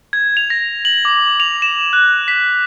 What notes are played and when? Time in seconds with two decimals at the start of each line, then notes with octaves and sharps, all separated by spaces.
0.13 G#6
0.37 F7
0.50 A#6
0.85 F#7
1.05 D6
1.40 F7
1.62 E7
1.93 F#6
2.28 B6